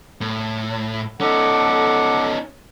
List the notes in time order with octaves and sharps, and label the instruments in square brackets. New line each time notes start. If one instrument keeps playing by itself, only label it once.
[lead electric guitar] A2
[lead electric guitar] C#4 D#4 [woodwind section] A4 F#5 D6